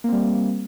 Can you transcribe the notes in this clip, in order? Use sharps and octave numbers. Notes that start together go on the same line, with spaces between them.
G3 A#3 C4